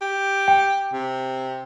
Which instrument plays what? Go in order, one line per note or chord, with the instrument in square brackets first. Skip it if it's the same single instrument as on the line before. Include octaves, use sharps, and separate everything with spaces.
[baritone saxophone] G4
[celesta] G5
[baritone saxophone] C3